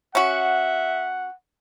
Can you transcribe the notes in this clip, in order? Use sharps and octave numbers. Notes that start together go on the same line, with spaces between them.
C#4 F#4 E5 F#5